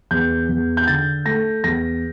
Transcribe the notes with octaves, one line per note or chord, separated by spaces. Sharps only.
E2 G6
E2
G6
D3 A6
A3 A#6
E2 A#6